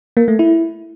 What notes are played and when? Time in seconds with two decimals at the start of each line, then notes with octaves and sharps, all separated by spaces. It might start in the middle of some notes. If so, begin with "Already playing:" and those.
0.17 A#3
0.28 A3
0.39 E4